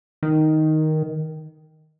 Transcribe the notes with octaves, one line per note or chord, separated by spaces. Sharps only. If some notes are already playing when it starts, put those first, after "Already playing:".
D#3